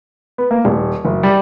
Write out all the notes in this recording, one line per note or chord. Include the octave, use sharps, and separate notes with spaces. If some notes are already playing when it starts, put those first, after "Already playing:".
B3
A#3
D#1
F#1
G3